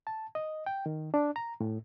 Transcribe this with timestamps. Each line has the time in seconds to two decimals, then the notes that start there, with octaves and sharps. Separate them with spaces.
0.07 A5
0.35 D#5
0.66 G5
0.86 D#3
1.14 D4
1.36 A#5
1.61 A2